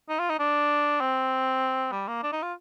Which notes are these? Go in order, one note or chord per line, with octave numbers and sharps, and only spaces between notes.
D#4
F4
D#4
D4
C4
G3
A#3
D4
D#4
F4